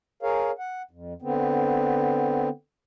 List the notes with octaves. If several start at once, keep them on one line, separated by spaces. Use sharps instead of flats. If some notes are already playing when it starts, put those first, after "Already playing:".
G#4 A#4 C#5 F5
F#5
F2
D3 B3 C4